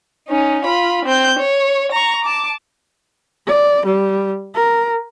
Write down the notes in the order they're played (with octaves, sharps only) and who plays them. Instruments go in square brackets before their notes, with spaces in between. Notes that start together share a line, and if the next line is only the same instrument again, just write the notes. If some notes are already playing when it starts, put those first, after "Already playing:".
[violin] C#4 D#4
F4 B5
C4 G6
C#5
A#5 C#6
A5 D6
[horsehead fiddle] D5
G3
A#4